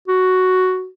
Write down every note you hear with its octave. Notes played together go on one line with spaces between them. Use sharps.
F#4